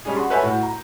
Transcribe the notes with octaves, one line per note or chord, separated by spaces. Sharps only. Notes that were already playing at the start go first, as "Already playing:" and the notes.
G3 C#4 D4 G#4
F#4 C6
A4 B4 C#5 E5 G#5 G6
A2 F#4
A#5